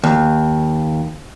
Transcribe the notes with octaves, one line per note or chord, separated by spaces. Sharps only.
D#2